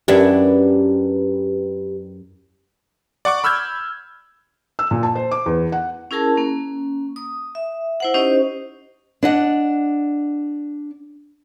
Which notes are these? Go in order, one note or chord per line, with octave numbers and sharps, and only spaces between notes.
F#2 C#4 D4 E4 G4 B4
D5 F#5 C#6 D6
B5 E6 F6 G6 G#6
E6
A#2
A5
C5
D6
E2
F#5
C#4 E4 G#4 A#4 A5
A#3 C#4
D#6
E5
E4 C5 F#5
C#4 D#4 G4 C5 D#5
D4 D#5 F#5